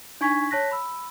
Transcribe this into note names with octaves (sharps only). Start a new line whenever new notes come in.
D4 D#4 G#5 C#6 G#6 B6
C#5 A5 F#6 A#6 B6
B5 E6